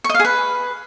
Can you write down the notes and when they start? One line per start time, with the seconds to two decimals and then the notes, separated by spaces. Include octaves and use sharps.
0.04 C#6
0.09 D#5
0.15 F5
0.20 G#4
0.25 B4